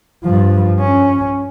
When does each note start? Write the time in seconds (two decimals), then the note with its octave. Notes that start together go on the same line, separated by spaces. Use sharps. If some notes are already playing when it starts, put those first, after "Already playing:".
0.24 G2 F3
0.80 C#4